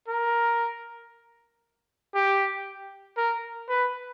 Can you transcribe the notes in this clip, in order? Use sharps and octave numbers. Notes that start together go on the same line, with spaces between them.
A#4
G4
A#4
B4